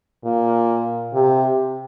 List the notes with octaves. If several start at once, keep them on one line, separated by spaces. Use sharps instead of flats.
A#2
C3